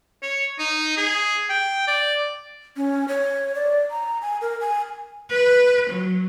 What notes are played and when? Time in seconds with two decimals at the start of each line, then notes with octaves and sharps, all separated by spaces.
0.23 C#5
0.59 D#4
0.97 G#4
1.49 G5
1.87 D5
2.77 C#4
3.08 C#5
3.55 D5
3.91 A#5
4.22 G#5
4.41 A#4
4.60 G#5
5.30 B4
5.90 F#3